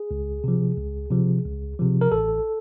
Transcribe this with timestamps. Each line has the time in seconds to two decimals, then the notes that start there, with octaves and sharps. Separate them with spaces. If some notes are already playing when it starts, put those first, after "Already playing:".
Already playing: G#4
0.11 C#2
0.44 C3 F3
0.78 C#2
1.11 C3 F3
1.45 C#2
1.79 C3 F3
2.01 A#4
2.12 A1 A4